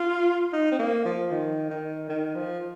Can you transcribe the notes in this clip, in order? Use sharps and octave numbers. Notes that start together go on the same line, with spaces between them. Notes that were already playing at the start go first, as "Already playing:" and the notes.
Already playing: F4
D#4
C4
A#3
F3
D#3
D#3
D#3
F3